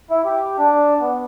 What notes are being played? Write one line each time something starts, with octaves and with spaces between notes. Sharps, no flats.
E4
G4
D4
B3